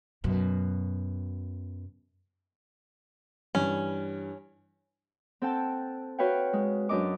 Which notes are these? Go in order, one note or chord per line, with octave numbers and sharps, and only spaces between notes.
F#2 B2
G2 E3 C#4
C4 A4 F#5 G5 A5
F#4 B4 C#5 F5 G5
G#3
F#2 D4 A#4 D#5 D6